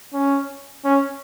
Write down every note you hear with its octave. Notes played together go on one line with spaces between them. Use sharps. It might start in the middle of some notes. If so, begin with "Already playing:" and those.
C#4
C#4